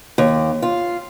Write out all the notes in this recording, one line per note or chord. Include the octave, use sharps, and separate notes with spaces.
D#2
F4